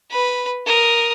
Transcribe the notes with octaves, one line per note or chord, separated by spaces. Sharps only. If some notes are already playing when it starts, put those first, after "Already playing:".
B4 B5
A#4 D#6